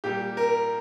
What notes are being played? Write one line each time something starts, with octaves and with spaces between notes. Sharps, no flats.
A#2 G3 G4
A#4